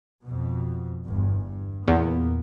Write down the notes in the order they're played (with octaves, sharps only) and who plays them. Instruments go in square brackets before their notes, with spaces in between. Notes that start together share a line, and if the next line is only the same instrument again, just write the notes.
[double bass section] F2 B2
G1 E2 G2
G2
[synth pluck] E2 [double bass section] A#2 A#3 B3